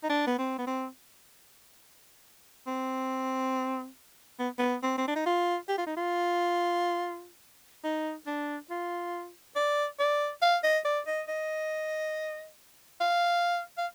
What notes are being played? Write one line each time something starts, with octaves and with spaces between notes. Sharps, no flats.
D#4
D4
B3
C4
B3
C4
C4
B3
B3
C4
C4
D4
D#4
F4
G4
F4
D#4
F4
D#4
D4
F4
D5
D5
F5
D#5
D5
D#5
D#5
F5
F5